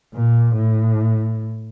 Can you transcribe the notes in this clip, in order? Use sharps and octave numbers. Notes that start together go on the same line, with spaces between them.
A#2
A2